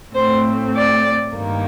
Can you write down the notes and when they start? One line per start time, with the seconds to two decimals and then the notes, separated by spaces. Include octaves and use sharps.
0.14 A2 A3 C4 C5
0.74 D5
1.34 G2 D#3 A#3